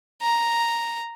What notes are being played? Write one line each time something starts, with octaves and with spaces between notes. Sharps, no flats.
A#5